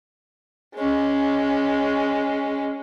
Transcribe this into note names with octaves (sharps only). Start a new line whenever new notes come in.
G#3 C#4